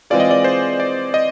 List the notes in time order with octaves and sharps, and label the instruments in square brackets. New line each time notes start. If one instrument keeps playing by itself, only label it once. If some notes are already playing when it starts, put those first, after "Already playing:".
[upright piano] E3 G#3 C4 F4 G#4 [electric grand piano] D5
[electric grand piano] D#5
D5
C5
D5
D#5